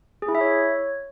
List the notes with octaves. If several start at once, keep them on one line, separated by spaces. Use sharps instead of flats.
G#4
E4
E5
C#5